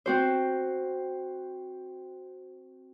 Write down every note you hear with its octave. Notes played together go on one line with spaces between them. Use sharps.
C4 F#4 C5